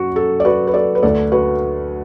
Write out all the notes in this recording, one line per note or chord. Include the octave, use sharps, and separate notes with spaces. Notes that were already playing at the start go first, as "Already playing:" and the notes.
Already playing: F#2 F#4
A4
D5
F#4 B4
B4
A4 D5
B4
D2 D3 A4 D5
F#4 B4